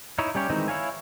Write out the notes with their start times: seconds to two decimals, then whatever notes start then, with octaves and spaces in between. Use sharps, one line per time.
0.19 D#4 E4 C#5
0.35 G3 C#4 G4 C#5
0.49 D#3 E3 G#3 C4 D#4
0.68 E4 C#5 F5 G#5